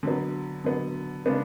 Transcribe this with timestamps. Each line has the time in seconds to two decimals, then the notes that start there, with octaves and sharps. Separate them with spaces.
0.03 D3 F#3 B3
0.64 D3 F#3 B3
1.26 C#3 G#3 B3 D4